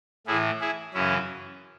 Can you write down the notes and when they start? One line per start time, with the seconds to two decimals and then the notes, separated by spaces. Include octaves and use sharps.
0.27 A2 E3 E4 G#4
0.60 E4 G#4
0.94 F#2 C#3 E3 C#4 E4